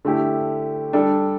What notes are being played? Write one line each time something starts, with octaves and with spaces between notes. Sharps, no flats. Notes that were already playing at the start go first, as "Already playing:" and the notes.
D3 A3 E4 G4
G3 D4 A4